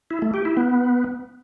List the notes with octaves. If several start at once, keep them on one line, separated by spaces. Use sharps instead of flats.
E4
A3
G4
E4
B3